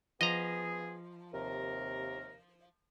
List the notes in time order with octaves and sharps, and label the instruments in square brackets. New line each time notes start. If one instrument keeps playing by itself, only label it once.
[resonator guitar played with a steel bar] F3 [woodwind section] B3 G#4 [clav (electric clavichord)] D#5 A#5
[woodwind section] D#2 C3 A#4